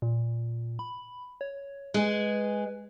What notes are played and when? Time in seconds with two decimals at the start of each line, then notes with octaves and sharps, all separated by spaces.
0.02 A#2
0.79 B5
1.41 C#5
1.94 G#3 G#4 B4